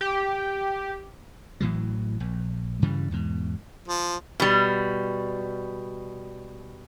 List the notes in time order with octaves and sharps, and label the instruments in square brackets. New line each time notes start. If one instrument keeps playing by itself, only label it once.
[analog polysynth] G4
[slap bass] A1 A2 E3 F#3
A#1
G2 C#3 E3 G3
E2 G#2 B2
[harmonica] F3
[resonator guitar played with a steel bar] B2 G3